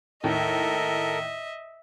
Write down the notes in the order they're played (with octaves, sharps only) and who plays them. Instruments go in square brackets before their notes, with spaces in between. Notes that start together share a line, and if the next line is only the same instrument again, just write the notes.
[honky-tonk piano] D#2 A2 [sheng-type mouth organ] A4 A#4 [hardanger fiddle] D#5 E5